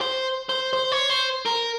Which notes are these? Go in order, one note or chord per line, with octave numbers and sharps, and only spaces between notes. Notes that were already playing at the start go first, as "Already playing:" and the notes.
C5
C5
C5
C#5
C5
A#4